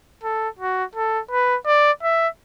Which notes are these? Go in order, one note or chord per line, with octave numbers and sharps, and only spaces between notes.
A4
F#4
A4
B4
D5
E5